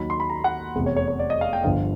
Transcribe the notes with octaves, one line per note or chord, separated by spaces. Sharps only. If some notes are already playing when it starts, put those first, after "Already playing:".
Already playing: D#2 D#3 F#3 B5
C6
B5
A#5
F#5
F1 E2 C3
C#5
C#5
C#5
D5
D#5
F5
G5
G1 G2 D3 F3 F5